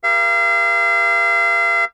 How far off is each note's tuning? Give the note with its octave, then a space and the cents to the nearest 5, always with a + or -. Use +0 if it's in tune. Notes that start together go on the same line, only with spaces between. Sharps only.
G4 +30 A#4 +30 F5 -35